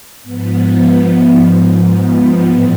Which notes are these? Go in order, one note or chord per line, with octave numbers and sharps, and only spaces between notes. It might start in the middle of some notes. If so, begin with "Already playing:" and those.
G#2 F3 B3
B3
G#2 F3
B3
A2 E3 G3 C4